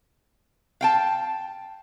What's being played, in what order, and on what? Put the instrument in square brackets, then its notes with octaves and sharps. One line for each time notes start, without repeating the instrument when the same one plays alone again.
[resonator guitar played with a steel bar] F5 G5 A5